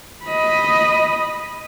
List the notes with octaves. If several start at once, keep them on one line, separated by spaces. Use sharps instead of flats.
D#5 B5